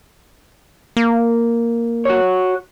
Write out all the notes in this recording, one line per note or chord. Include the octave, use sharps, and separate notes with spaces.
A#3
F#4 C#5